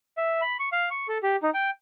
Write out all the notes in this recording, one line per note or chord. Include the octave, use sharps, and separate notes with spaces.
E5
B5
C#6
F5
C#6
A4
G4
D#4
G5